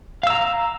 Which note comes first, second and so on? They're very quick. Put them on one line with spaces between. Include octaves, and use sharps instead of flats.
F5 E6 A#5